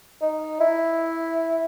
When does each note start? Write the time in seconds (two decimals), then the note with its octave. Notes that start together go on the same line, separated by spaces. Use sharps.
0.22 D#4
0.60 E4